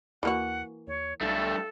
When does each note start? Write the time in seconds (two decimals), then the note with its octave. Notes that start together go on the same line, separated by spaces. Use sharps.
0.23 D#2 E3 A#3 F#4 F#5
0.88 D#2 C#5
1.21 B1 G2 A3 A4